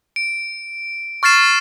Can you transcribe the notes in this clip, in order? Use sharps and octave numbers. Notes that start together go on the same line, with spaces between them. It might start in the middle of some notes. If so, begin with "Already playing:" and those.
D7
C#6 F6 A6 C7 E7